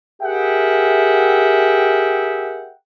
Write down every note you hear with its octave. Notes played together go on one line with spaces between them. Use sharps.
G4 G#4 A#4 E5 F#5 G5